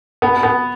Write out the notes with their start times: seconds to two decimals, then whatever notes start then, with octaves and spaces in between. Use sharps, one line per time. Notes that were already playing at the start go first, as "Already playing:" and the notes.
0.22 B3
0.43 B3